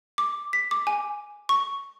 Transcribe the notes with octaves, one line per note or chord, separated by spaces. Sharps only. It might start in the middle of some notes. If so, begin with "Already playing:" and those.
D6
B6
D6
G#5
C#6